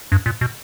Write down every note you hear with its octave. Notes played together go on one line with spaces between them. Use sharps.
G2
A#2
B2